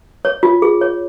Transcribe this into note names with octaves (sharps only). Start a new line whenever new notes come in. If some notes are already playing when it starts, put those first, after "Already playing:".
C#5
F4
G#4
C#5